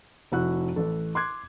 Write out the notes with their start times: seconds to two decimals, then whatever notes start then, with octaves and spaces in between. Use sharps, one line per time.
0.32 F1 E4 F#4 F#6
0.76 A1 A4
1.15 C6 D6 F#6 G#6